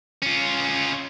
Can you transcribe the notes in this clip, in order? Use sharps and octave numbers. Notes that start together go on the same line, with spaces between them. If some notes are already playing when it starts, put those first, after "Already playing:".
C#4 F4